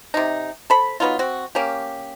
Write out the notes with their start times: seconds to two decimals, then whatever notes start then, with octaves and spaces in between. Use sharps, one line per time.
0.14 C3 D#4
0.70 A4 C5 B5
1.00 F#3 B3 D#4 F4
1.19 C4 F#4
1.55 A#3 C#4 G4